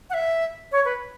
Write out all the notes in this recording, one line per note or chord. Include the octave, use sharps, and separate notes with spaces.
F#5
E5
C#5
B4